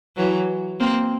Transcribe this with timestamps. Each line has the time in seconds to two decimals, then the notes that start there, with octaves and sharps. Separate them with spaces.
0.16 E3 F#3
0.80 A#3 C4